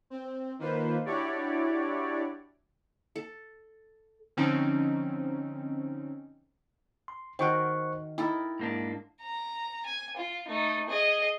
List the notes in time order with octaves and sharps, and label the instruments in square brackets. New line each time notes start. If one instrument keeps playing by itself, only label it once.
[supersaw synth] C4
D#3 A#3 F4 B4 C5
D4 E4 F#4 G4 C#5 D5
[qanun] A4
[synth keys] D3 F3 C4 C#4 D#4
[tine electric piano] C6
[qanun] D#3 A#4 [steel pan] F#4 G5 [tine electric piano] C5 C#6 F#6
[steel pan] D#4 [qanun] E4 A4 A#4 [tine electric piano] G5
[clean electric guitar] G#2 A#3 D4
[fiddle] A#5
G#5
F4
A3 D#4
G#4 D#5